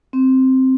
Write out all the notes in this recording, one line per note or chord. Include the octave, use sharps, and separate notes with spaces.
C4